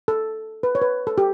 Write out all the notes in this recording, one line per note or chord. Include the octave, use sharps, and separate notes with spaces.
A4
B4
C#5
B4
A4
G4